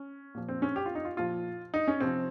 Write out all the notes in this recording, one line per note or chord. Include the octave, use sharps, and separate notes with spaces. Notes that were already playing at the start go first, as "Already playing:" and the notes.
Already playing: C#4
A#2 F3
C4
C#4
G4
F4
D#4
F4
A#2 F3 F4
D#4
C#4
C3 F3 C4